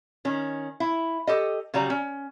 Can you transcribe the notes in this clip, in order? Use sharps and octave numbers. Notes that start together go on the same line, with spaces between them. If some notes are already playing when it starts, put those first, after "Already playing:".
D#3 C#4
E4
G4 A4 D#5
C#3 F#3 G3 F#4 A#5
C#4